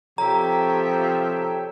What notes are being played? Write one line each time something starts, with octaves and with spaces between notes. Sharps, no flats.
C3 F3 G4 A4 C#5 E5 G5 A#5